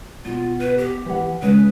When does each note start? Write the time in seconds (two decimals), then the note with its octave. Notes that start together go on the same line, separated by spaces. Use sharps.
0.25 B2 F4
0.60 B4
0.78 G4
1.06 E3 F#5
1.42 C#3 G#3 C#4 B4